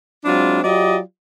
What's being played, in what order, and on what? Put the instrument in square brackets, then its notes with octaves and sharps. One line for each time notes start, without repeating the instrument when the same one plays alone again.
[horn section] F#3 G#3 C4 D4 E4 F4
F#3 F4 G4 D5 D#5